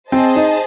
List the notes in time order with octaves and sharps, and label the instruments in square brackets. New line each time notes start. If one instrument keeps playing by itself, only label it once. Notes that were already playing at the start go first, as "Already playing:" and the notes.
[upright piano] C4 [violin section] G#4 C5 D#5 A5
[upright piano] D#4